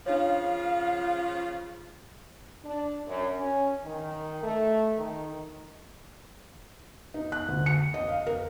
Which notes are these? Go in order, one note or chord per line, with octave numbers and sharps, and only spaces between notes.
C#3 F3 D4 F4 C#5 F5
D4
F#2
C#4
D#3
A3
D#3
D#4
F#6
D2
C#7
D#5
F5
A#4